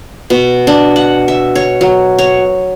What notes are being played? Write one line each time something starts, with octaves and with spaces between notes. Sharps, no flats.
B2
D4
F#5
E5
C#5
F#3
C#5